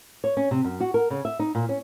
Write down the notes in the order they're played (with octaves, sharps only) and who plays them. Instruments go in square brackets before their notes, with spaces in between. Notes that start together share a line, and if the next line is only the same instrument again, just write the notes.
[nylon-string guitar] C#5
C#4
C3
F#2
F#4
A#4
C#3
E5
D#4
A#2
C#4